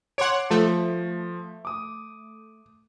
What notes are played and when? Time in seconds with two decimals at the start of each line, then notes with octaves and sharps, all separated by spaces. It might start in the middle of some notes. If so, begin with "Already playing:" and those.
0.18 C#5 F#5 C6 D6 D7
0.50 F3 A3
1.65 D6 D#6